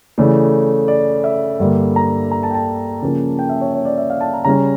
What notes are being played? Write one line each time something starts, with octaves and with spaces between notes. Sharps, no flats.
C#3 E3 A3 D5
D5
E5
G2 D3 G3 A#3
A#5
A#5
A5
G5
A5
C#3 F3 A#3 C#4
G5
E5
C#5
C#5
D5
E5
F5
A5
A#5
C#3 G3 C#4 A#5